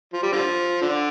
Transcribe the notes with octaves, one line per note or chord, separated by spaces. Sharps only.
F3
G3
D3 F3
D3